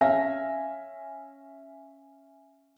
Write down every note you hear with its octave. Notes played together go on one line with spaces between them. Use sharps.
C#4 E5 F5 G#5 A#6